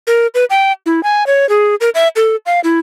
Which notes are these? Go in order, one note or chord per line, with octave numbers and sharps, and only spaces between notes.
A#4
B4
G5
E4
G#5
C#5
G#4
A#4
E5
A4
F5
E4